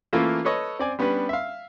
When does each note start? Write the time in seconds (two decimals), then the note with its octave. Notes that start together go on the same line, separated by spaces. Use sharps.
0.13 E3 A3 A#3 C#4 E4 F4
0.45 A4 B4 C#5 D#5
0.79 C4 D5 G#5
0.99 G3 B3 C#4 D4 B4
1.29 E5 F5